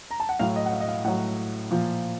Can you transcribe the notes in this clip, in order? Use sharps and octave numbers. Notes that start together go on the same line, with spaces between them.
A#5
A5
F#5
A2 F#3 F5
D#5
F#5
F5
D#5
F5
A2 F#3 F#5
A#2 F3